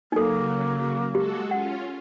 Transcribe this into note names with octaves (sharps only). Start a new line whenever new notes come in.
C#3 F#3 A#3 D#4 A4
G#3 F#4 G4 A4
C#4 F4 F#5